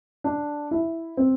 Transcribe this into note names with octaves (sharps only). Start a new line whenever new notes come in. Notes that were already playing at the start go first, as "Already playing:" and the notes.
D4
E4
C4